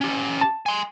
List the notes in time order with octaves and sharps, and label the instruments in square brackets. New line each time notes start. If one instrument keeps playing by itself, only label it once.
[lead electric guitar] C#4 G4
[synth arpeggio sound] A5
[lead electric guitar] G#5 C6